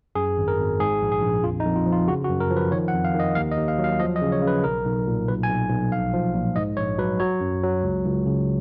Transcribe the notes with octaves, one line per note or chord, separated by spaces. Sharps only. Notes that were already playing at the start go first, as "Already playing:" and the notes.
F#2 G#4
G#1
A#4
G#1
G#2 G#4
A#1
G#4
A#1
F2 F4
D#4
F2
F4
F3
F4
C#3 F#4
F#4
F#2
A#4
F3
B4
D#3 C#5
F#5
F2
F5
D#3
D#5
D#2 F5
D#5
D#2
F5
F#3
F5
F3 D#5
D#5
C#3
C#5
C#3
B4
B1 A#4
B1
A#2
B1 B4
G#5
B1
B1
A#1 F5
F3
A#2
G#2 D#5
A#1 C#5
F#3 B4
F#3 C#5
F#2
F#3
C#2
C#2
C#3